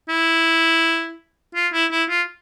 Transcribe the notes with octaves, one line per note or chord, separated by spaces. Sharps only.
E4
F4
E4
E4
F4